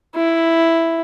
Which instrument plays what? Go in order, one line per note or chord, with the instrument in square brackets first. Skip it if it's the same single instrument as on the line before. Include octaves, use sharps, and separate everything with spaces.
[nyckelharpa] E4